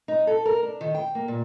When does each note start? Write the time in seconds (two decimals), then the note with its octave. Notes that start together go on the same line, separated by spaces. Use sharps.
0.08 D#4
0.27 A4
0.45 A#4
0.63 D4
0.81 D#3
0.95 G5
1.15 A#3
1.28 A#2